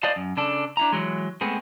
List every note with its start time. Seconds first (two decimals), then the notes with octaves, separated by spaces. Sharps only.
0.03 C5 D5 D#5 F5 A5
0.16 F#2
0.37 C#3 D4 A4
0.77 D4 E4 A#5
0.92 E3 F#3 G#3
1.41 G#3 A3 B3 C4 G#4